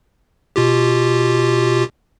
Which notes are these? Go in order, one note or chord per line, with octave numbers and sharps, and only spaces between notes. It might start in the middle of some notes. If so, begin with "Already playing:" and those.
B2 F4 G4